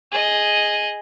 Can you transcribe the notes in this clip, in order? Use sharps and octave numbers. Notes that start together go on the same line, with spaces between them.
G#4 D#5